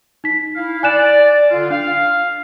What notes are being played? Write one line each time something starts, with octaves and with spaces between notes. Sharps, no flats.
D#4 B6
E4 F5
D5 G#5 F#6 E7
D3 F4
D4 F5